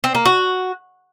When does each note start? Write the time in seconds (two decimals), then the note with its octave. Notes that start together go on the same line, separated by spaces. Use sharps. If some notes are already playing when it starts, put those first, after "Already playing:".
0.04 C4
0.15 A#3
0.25 F#4